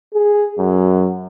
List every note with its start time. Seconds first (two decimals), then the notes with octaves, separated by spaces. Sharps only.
0.14 G#4
0.58 F#2